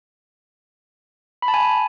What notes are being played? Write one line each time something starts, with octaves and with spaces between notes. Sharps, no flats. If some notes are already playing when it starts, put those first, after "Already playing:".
B5
A5
G#5